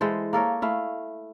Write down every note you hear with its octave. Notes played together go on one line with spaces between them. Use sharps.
E3 G#3 A4 C5
A#3 A4 A#4 C#5
A3 E4 F5